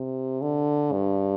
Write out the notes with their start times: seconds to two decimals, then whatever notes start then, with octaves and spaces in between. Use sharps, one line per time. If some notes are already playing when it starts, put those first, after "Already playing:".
Already playing: C3
0.42 D3
0.92 G2